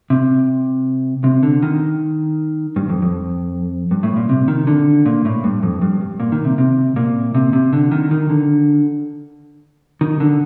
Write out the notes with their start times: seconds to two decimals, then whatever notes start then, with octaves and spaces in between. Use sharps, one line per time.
0.10 C3
1.24 C3
1.43 D3
1.63 D#3
2.76 G2
2.89 F2
3.02 F2
3.91 G2
4.03 A2
4.16 A#2
4.29 C3
4.48 D#3
4.67 D3
5.06 A#2
5.25 A2
5.44 G2
5.63 F2
5.82 G2
6.01 G2
6.20 A#2
6.32 D#3
6.45 C3
6.58 C3
6.96 A#2
7.35 C3
7.53 C3
7.73 D3
7.91 D#3
8.11 D#3
8.30 D3
10.01 D#3
10.20 D3